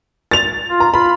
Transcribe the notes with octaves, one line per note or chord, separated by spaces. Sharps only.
A6 F7
F4
A#5
F4 B5